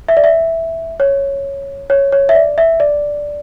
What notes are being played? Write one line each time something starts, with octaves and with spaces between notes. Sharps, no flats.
E5
D5
E5
C#5
C#5
C#5
E5
D5
E5
D5